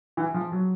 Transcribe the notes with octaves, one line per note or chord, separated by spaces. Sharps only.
E3
F3
F#3